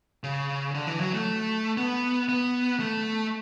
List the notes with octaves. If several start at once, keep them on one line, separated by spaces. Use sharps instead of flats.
C#3
D3
E3
F#3
A3
B3
B3
A3